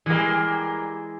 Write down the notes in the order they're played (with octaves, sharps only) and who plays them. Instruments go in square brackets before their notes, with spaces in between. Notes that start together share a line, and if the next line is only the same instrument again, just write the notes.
[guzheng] E3 G#3 [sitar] G3 A#3